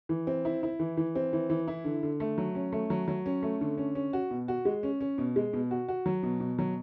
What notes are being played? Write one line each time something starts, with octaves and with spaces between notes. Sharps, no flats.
E3
C4
E4
E4
E3
E3
C4
E3
E3
E4
D3
D3
A3
F#3
C#4
A3
F#3
F#3
C#4
A3
D3
C#4
C#4
F#4
B2
F#4
G#3
C#4
C#4
B2
G#3
B2
F#4
F#4
F#3
B2
B2
F#3